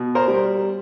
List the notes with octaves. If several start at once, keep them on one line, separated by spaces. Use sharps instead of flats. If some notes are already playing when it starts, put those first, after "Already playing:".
Already playing: B2
A#4 C5
G3